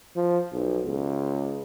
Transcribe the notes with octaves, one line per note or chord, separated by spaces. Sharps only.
F3
B1
C#2